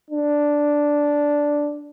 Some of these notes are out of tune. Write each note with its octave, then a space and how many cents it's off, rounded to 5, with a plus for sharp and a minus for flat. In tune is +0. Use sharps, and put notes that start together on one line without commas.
D4 -5